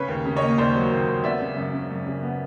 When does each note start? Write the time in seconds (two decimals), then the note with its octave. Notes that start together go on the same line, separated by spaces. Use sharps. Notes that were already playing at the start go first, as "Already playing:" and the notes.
Already playing: C#3 B4 C#5
0.08 D#2
0.25 C#3
0.37 C#5 D#5
0.42 A#3
0.58 D#2 C5 D5
0.74 F#3
0.92 D#2
1.08 D#2
1.24 B3 D5 E5
1.40 C#3
1.56 F#2
1.73 C#3
1.90 F#2
2.06 C#3
2.23 B3